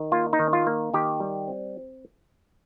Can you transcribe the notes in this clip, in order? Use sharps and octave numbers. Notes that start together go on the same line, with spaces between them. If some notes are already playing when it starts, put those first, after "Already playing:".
Already playing: D#3
A#3 F4
D#4
D#3
F4
A#3
D#3 G4
G3
C4